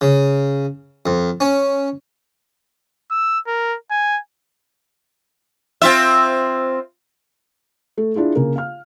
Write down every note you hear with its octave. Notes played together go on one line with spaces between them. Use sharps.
C#3
F2
C#4
E6
A#4
G#5
C4 F4 E5
A3
D4 E4 F4 G#4
C#3 A#3
F5 F6